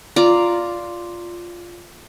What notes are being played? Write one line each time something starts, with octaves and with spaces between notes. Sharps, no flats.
F4 D5 A#5